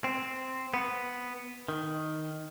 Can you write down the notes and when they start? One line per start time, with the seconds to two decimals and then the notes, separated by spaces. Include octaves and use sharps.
0.04 C4
0.74 B3
1.68 D#3